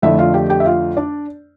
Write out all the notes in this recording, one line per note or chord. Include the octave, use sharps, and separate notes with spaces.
F2 D3 A3 E4 E5
F4 F5
G4 G5
G4 G5
E5
F4 F5
D4 D5